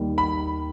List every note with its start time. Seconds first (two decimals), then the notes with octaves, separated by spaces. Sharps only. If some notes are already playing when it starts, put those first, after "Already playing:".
Already playing: D#2 D#3 G3
0.18 B5